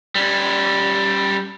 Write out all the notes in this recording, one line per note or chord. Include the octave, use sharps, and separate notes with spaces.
G3 C#4